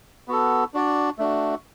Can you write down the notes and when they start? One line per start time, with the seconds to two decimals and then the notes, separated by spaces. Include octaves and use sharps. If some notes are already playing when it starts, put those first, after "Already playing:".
0.28 B3 F#4 A4
0.74 D4 F#4 D5
1.18 A3 D4 F#4